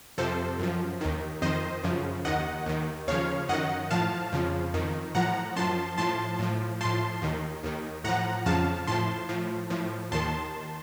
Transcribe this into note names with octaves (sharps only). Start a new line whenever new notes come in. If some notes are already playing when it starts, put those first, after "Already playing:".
F2 C3 F3 A4 C5
F#2 F3
D#2 D#3
F2 D#3 C5 D#5
F#2 C#3 F3
D#2 D#3 D#5 F#5
D#2 D#3
D#2 C#3 F3 C#5 F5
F#2 D#3 D#5 F#5
A2 F3 F5 A5
F2 C#3 F3
F2 D#3
A2 F3 F#5 A#5
F#2 F3 A5 C6
A2 F3 A5 C6
A2 F3
A2 F3 A5 C6
D#2 D#3
D#2 D#3
A2 F3 F#5 A#5
F2 C#3 F3 F5 A5
A2 F3 A5 C6
A2 F3
A2 F3
D#2 D#3 A5 C6